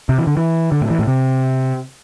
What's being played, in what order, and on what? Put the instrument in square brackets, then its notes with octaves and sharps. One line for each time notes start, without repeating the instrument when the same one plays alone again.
[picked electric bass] C3
E3
D3
E3
D3
A2
E3
A2
C3